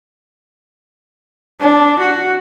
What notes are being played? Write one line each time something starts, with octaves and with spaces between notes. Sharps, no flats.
D4
F#4